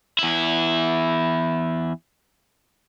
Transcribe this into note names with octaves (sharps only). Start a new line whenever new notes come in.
E2 E4